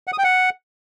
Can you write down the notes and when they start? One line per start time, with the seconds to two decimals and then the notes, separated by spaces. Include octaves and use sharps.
0.07 F#5
0.13 D#6
0.18 G5
0.24 F#5